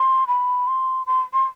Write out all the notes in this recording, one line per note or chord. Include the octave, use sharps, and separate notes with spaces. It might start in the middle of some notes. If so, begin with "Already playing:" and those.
Already playing: C6
B5
C6
C6
C6